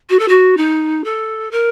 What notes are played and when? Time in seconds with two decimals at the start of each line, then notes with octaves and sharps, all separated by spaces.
0.09 F#4
0.19 A4
0.28 F#4
0.57 D#4
1.04 A4
1.51 A#4